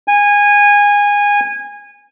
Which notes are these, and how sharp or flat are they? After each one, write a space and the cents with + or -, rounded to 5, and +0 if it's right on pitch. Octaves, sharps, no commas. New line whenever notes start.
G#5 -20